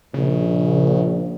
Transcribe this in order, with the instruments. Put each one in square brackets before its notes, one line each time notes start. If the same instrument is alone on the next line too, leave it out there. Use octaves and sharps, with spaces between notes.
[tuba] A#1 [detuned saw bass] C#3